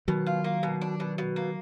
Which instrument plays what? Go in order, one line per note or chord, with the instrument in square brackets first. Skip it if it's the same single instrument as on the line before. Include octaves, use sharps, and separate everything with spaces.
[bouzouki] B2 [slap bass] D#3 F#3
[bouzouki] F4
A#3
B2
D4
B2
B2
A#3